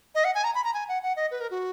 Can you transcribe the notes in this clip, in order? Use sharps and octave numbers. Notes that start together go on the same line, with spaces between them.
D#5
F#5
G#5
A#5
B5
A#5
G#5
F#5
F#5
D#5
B4
A#4
F#4